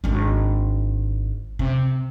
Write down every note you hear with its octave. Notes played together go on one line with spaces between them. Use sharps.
G#1 D4
C3